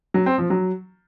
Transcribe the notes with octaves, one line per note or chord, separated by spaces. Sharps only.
F#3
C4
F3
F#3